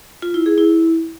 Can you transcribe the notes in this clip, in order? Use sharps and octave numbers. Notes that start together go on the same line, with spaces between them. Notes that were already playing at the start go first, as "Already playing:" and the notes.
F4
E4
G#4
E4